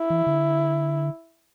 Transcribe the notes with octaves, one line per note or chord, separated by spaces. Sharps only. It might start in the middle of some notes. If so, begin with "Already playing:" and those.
Already playing: E4
E3
D3